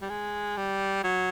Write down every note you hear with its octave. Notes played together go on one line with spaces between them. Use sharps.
G3
G#3
G3
F#3